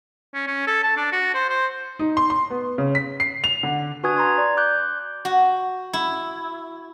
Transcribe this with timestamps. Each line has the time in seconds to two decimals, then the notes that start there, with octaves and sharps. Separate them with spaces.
0.34 C#4
0.47 C#4
0.67 A4
0.83 A5
0.97 D4
1.12 F#4
1.34 C5
1.49 C5
1.99 D#4
2.17 C6
2.30 C6
2.50 B3
2.78 C#3
2.95 B6
3.20 C7
3.44 F7
3.63 D3
4.03 D4 F#4 B4 G#5 D#6 G#6
4.16 A#5 C6 G#6
4.38 D5
4.57 D6 F#6 G6
5.25 F#4
5.93 E4